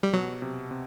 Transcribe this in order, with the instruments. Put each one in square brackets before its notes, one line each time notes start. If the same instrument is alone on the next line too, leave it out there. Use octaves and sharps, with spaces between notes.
[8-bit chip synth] G3
[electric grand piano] B2 [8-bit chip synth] F#3
[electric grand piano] C3
C3